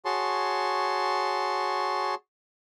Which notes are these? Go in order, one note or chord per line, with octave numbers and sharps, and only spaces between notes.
F#4 G#4 C#5 A5 C6